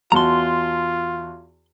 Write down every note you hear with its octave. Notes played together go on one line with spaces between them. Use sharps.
E2 F4 F#4 A5 A#5 C6